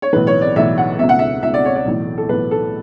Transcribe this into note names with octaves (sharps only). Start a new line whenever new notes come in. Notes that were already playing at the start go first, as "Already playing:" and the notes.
C#5
B1 A2 E3 B4
C#5
D5
B1 A2 E3 E5
F#5
C#2 B2 E5
F#5
E5
C#2 B2 E5
D5
C#5
D5
B1 A2 E3
A4
B1 A2 E3 B4
A4